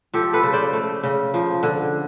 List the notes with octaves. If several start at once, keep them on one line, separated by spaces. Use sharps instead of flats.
F3 G4 A4
A4 B4
C#3
C5 D5
A3
C#3
F3
D3